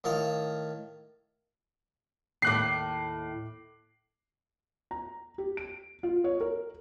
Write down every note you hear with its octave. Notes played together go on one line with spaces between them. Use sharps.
A2 D#3 F5
D#2 A2 D6 F#6 C7
A#5
G4
D7
F4
C#5
A#4